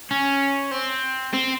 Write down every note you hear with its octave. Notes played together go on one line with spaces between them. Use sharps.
C#4
C4
C4